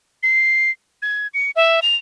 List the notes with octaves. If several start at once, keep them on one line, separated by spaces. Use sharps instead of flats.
C7
G#6
C#7
E5
F7